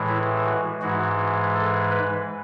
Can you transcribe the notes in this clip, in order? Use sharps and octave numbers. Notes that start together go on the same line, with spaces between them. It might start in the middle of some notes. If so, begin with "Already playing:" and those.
Already playing: A2 E3 G#3
E4
F#4
G#2 E3 G#3 F#4
A4
B4